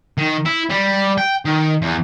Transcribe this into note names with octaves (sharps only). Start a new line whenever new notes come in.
D#3
E4
G3
G5
D#3
E2